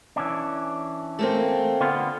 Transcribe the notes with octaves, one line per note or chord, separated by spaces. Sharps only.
E3 C#4 D4
A3 A#3 C4
D3 B3 F4